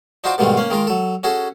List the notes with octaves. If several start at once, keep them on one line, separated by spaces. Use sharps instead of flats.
D4 D#4 F4 F#4 C5 D6
G#2 B2 D#3 G3 A3 F4
A#3 C#4 F5
D#3 G#3 F4 A#4
F#3 A4
C#4 F#4 G#4 A4